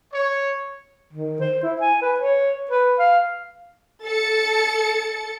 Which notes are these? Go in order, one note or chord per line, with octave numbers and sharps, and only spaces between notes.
C#5
D#3
C5
E4
G#5
B4
C#5
B4
F5
A4 A6 C#7